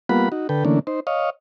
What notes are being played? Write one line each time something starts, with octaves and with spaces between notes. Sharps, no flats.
G3 A#3 B3 F4 F#5 B5
D#4 F#4
D3 A4 B4 G5
D3 E3 A3 A#3 C#4 D4
D#4 C5
C#5 D#5 F5